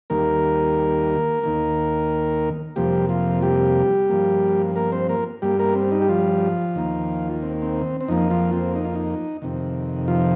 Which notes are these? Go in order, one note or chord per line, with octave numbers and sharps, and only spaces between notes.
D#2 D#3 G3 A#3 A#4
D#2 D#3 A#3
F2 C3 F3 G3 A#3 G4
F3 F4
G3 G4
G2 F3 A#3
A#3 A#4
C4 C5
A#3 A#4
G2 G3 A#3 G4
A#3 A#4
C4
D#4
G4
F3 F4
D#2 D#3 A#3
C4
C4
C4
F2 F3 A#3 D#4
F3 F4
C4
D#4
F4
D#4
F2 C3 D#3
F3 F4